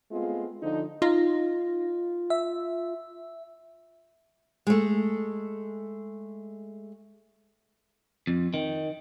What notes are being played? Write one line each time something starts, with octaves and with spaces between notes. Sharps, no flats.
G#3 A3 B3 C4 F4
D3 F3 D#4
D#4 F4
E5
G#3 A3
F2
D#3